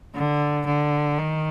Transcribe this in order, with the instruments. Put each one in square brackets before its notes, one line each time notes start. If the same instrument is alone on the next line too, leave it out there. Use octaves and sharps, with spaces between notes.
[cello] D3
D3
D#3